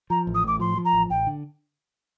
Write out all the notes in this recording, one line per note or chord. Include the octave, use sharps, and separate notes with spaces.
F3 A#5
A1
D#6
A2 D6
F3 C6
F3
A#5
A1
A1 G5
D3